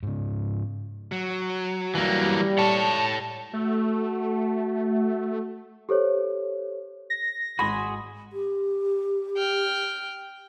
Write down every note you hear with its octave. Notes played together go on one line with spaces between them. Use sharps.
G#2 C#3
F#3
E3 G3 A#3
A4 C#5 A5
A3 F#4
G4 A4 C5 C#5
A#6
G#1 G#3 F#4 G#4 B5 C6
G4
G5 F6